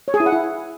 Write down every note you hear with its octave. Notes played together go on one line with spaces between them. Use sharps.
C#5
G#4
E4
F#5
E4